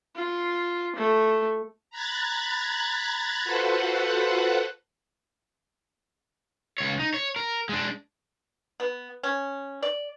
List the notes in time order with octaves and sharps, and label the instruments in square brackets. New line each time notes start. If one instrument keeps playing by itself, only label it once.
[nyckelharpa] F4
A3
[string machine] A#5 B5 F#6 G#6 A6
F4 F#4 A4 B4 C5 F#5
[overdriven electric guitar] C#2 C#5
D#4
C#5
A#4
G#3 D4
[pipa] B3
C#4
D5